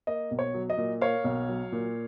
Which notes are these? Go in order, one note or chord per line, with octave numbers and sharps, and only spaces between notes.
A#3 D#5
B1
C#5
F#3
D#5
A#2
A#3 C#5 F5
B1
F#3
A#2